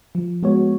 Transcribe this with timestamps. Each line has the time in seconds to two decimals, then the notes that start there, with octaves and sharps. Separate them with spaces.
0.15 F3
0.43 G#3 B3 F#4 C#5